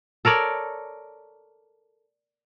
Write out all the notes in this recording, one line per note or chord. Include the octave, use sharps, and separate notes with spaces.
A4 A#4 C#5 D5